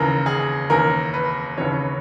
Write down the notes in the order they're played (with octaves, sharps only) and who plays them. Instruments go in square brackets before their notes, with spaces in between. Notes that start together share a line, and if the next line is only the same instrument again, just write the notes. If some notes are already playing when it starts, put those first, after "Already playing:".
Already playing: [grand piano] D#2 C#3 E3 A#4
G#4
D#2 C#3 E3 A#4
B4
D#2 C#3 E3 C#5